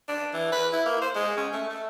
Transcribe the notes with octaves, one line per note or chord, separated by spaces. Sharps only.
D4
E3
B4
E4
A#3
C5
G#3
C#4
A3
A3